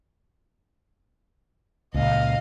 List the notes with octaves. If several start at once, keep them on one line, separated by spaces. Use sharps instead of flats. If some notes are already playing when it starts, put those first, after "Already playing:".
C#2 A#2 D#5 F5